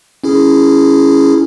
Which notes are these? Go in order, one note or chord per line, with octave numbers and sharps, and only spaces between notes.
C#4 E4 G#4